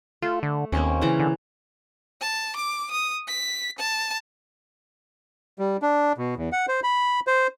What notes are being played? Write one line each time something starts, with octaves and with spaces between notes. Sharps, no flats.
A3 F4
D3
D#2 A#3 C4 C#4
C#3 E3 A#5
D3
A5
D6
D#6
B6
A5
G3
D4
B2
E2
F#5
C5
B5
C5